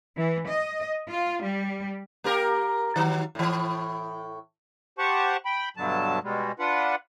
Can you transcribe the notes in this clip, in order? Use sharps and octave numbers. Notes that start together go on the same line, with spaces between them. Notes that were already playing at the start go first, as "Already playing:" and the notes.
E3
D#5
F4
G3
A#3 G4 A#4
D#3 F#3
A2 E3
G4 C5 F#5 A5 C#6
G5 B5
G2 B2 D3 F#3 A5
B2 G3 G#3
D4 F4 B4 F#5